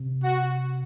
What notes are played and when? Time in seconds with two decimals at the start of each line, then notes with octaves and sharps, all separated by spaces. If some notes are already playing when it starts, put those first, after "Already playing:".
Already playing: C3
0.24 F#4